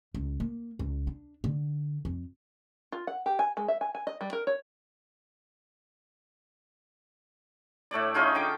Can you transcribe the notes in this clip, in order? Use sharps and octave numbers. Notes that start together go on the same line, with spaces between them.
C#2
A#3
C#2
D4
D3
F2
F4
F#5
G4
G#5
G#3
E5
G#5
G#5
D#5
G3
A#4
C#5
A2 A3 C#5 D5
C#4 D#4 F4 G#4
D3 G5 D6